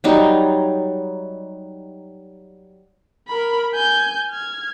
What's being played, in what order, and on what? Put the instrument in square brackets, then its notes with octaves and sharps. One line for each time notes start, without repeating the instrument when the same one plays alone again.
[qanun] F#3 G3 D#4
[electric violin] A#4 B5
G#5 G6
F6 G#6